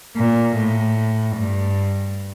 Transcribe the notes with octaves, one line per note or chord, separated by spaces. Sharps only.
A#2
A2
G2